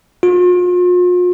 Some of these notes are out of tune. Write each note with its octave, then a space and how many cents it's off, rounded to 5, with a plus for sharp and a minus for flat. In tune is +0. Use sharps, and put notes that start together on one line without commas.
F4 +40